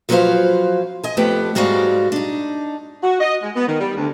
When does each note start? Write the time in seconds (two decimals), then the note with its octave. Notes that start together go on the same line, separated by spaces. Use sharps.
0.09 F3 F#3 C#4 B4 C5 F5
1.03 D#5 G#5
1.17 F2 A3 B3 G4 B4 G5
1.55 G#2 G3 G#3 F#4 D5 F5
2.12 D4 D#4
3.03 F#4
3.21 D#5
3.42 G#3
3.55 B3
3.68 D#3
3.80 G3
3.97 D2